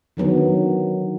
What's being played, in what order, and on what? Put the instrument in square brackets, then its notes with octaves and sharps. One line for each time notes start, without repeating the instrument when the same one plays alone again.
[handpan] D3 D#3 F#3 B3